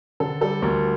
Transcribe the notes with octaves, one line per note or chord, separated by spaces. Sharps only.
D3 A4
G3 A4
D2 A#4